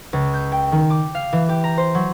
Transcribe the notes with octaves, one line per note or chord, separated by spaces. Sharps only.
C#2
G6
G5
D#3
D6
F5
E3
G4
A#5
C5
F#3